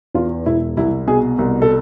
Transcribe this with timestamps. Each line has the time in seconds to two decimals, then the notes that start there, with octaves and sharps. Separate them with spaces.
0.14 E2 F4
0.46 E1 E4
0.77 C2 E4
1.07 B2 G#4
1.39 C2
1.62 A4